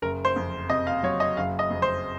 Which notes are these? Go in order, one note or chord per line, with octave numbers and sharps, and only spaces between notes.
F#1 A#4
C5
F2
C3 D#5
F5
F#3 C#5
D#5
F#1 F5
D#5
F2
C5